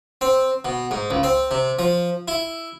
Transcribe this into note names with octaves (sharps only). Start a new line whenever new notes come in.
C4
B2
G#2
C#2
C4
C3
F3
E4